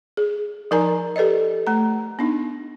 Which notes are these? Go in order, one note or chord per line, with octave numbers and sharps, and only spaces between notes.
G#4
F3 D#4 A#4 D5 G#5 A#5
G4 A4 B4 D5 D#5
A3 A#5
B3 D4 D#4